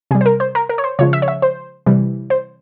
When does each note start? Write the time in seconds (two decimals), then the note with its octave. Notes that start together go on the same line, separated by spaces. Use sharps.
0.11 C3 G#4
0.15 G3
0.21 C5
0.26 A#4
0.40 C5
0.55 A#4
0.69 A#4
0.78 C#5
0.84 C5
0.99 C#3 F3 G#3 C#5
1.13 E5
1.22 C#5
1.28 E5
1.42 C5
1.86 C3 E3 G3
2.30 C5